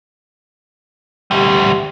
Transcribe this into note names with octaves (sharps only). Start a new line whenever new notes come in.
D2 G3 G4